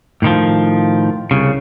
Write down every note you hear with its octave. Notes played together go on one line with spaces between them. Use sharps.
A2 D#3 F3
C2 C#3